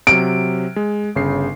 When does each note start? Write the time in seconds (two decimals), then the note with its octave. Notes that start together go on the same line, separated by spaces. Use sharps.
0.07 C3 F#3 D7
0.76 G#3
1.16 G1 C#3 C7